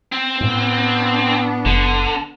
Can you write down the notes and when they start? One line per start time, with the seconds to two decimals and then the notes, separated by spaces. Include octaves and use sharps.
0.12 C4
0.41 A2 B3 D4
1.65 F#1 D3